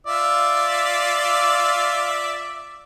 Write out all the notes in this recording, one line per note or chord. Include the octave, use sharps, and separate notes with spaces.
F4 D5 E5